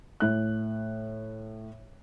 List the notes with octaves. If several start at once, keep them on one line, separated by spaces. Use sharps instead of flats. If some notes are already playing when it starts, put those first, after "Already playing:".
A2 F#6